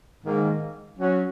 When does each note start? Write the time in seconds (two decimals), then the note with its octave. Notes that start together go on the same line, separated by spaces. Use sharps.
0.24 G#2 D#3 A#3
0.97 F#3 C#4 F#4